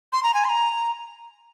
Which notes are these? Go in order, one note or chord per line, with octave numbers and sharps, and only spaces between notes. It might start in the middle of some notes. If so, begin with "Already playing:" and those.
C6
A#5
G#5
C6
A#5